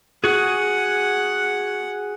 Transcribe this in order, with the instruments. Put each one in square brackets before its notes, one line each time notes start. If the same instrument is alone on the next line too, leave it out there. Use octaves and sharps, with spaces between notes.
[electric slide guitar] F#4 G#4 [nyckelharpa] F#5